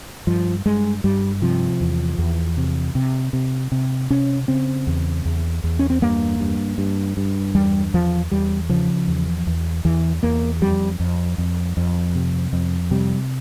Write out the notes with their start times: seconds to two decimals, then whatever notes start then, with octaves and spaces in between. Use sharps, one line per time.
0.27 G2 F3
0.66 G2 G#3
1.04 G2 G3
1.42 C3 F3
1.81 E2
2.18 E2
2.57 C3
2.95 C3
3.33 C3
3.72 C3
4.10 C3 C#4
4.48 C#3 C4
4.87 E2
5.25 E2
5.64 E2
5.79 C#4
5.90 C4
6.02 G2 A#3
6.40 G2
6.78 G2
7.17 G2
7.55 E2 G3
7.94 E2 F3
8.31 E2 G3
8.70 C#3 F3
9.08 E2
9.47 E2
9.85 E2 E3
10.23 E2 A#3
10.62 F2 G3
11.00 F2
11.38 F2
11.77 F2
12.15 C3
12.53 F2
12.91 C3 G3